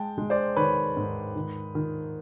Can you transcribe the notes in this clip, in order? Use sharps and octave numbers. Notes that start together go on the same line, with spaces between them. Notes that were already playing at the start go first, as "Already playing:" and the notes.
Already playing: G#3 G5 A5
G#3
C5 D5
D#3 B4 C#5
G#2
D#3
D#3